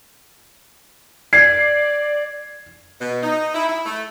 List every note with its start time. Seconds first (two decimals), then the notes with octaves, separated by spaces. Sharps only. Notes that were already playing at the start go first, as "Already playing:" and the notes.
1.33 D5 G#6 C7
3.00 B2
3.23 D#4
3.55 E4
3.68 E4
3.86 A3